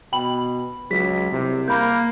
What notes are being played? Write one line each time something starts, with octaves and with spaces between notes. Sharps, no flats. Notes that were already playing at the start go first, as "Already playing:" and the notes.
B2 G5 B5 F#7
C#2 F#3 G#4 B6
C2 C3
A#3 B5 G6